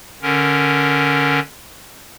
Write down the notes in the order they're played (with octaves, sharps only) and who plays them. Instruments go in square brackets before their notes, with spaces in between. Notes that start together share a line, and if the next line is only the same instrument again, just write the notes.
[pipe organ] D3 C#4 A#4